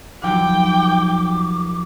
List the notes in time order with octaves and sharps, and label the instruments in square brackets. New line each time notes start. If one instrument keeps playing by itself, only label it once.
[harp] D#2 F3 F#3 [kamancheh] G5 [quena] D6